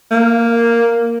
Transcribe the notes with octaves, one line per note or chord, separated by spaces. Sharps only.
A#3